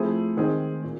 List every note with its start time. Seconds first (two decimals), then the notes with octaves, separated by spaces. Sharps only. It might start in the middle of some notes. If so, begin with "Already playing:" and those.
Already playing: F3 A3 C4 E4 G#4
0.37 D#3 G#3 C4 D#4 G#4
0.83 A#2